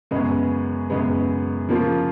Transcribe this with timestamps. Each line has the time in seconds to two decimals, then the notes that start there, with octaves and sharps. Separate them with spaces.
0.11 F#2 C#3 G#3 B3
0.90 F#2 C#3 G#3 B3
1.69 C#3 F3 A#3 F4